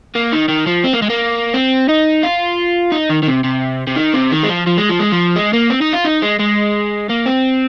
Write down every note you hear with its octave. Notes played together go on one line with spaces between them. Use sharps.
A#3
D#3
D#3
F3
C4
A#3
G#3
A#3
C4
D#4
F4
D#4
D#3
D#3
C3
C3
C3
D#3
C3
D#3
G#3
F3
F3
G#3
F3
G#3
F3
G#3
A#3
C4
D#4
F4
D#4
G#3
G#3
A#3
C4